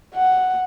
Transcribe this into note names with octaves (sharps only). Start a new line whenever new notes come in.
F#5